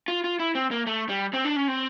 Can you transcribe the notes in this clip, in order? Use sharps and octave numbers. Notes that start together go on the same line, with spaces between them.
F4
F4
E4
C4
A#3
A3
G3
C4
D4
C#4
C4